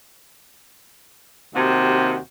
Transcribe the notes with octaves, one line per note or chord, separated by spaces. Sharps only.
D#2 C3 F#4